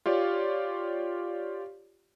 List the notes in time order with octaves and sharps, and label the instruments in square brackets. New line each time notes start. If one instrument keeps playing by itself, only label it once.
[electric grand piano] F4 G4 C#5 D5 F5